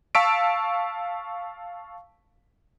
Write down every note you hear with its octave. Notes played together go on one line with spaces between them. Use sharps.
F5 A5 C#6 E6 B6 D7